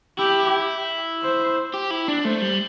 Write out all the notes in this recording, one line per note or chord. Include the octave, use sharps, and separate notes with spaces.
E4 G4
C5
G4
E4
D4
A3 C5
G3